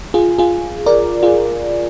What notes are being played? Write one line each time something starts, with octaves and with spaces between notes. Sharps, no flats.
F4 G#4
F4 G#4
A#4 D5
F4 G#4